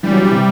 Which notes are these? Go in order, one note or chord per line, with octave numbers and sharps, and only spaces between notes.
E3 G3
F#3
E3
C3